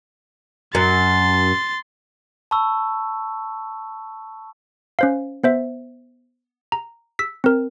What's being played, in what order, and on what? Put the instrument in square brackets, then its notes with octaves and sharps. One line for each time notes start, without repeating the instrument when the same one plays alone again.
[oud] F#2 [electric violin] C6 A6
[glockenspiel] A5 B5 C#6 E6
[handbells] C#4 C5 F5
B3 C5 E5
A#5
E6 B6
C4 A#4